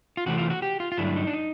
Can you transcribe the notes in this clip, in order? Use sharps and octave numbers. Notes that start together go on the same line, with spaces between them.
F4
C3 E3 A3 C4 F#4
F4
F#4
G4
F4
F4
G2 D3 F#3 A3 D4 E4
D#4
D4
D#4